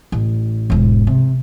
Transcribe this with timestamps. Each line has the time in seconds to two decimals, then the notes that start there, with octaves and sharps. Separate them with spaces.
0.12 A1
0.70 E1 G#2
1.07 C3